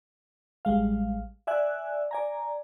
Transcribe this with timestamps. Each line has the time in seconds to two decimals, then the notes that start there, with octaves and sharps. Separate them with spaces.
0.65 A1 G3 G#3 F5
1.47 D5 E5 G#5 F#6
2.11 D5 G#5 A#5